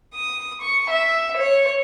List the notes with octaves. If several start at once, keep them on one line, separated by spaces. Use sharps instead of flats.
D#6
C#6
E5
C#5